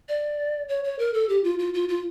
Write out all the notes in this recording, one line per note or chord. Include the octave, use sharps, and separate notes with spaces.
D5
C#5
C#5
A#4
A4
G4
F4
F4
F4
F4